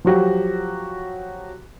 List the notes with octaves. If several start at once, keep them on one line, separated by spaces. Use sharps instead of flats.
F3 F#3 F#4 G4